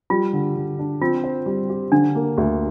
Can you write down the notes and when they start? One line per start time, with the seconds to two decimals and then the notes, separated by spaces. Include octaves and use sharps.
0.10 G3 F4
0.33 D3
0.56 D3
0.79 D4
1.02 C4 F4
1.24 C5
1.46 G3
1.70 G4
1.92 D3 D4
2.15 A#3
2.38 D2